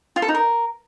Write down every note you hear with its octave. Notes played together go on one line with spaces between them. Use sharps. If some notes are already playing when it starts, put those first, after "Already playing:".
F4
A4
D#4
A#4